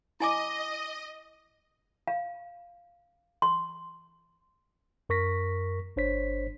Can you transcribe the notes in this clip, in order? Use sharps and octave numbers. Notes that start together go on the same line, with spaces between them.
E4 D#5 G#5 D6
F5
C6
F#2 A#4 C#6 A#6 B6
G1 D4 C5 C#5 B6